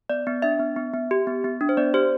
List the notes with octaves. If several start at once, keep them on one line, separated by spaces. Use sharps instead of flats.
B3 D5
B3
D4 E5
B3
B3
B3
G4
B3
B3
D4
C5
B3 D5
G4 C5